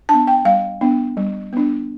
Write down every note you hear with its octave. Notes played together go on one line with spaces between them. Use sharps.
B3 D4 A5
G5
G3 F5
B3 D4
G3
B3 D4